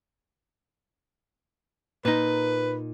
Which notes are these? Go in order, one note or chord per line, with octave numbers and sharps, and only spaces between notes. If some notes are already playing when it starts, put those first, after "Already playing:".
A#2 D#4 B4